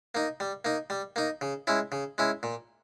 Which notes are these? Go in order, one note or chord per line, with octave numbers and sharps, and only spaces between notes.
A#3 D#4
G3
A#3 D#4
G3
A#3 D#4
C#3
G#3 C#4 E4
C#3
G#3 C#4 E4
A#2